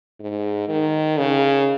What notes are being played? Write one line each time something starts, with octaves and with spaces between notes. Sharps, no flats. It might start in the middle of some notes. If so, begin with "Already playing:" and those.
G#2
D#3
C#3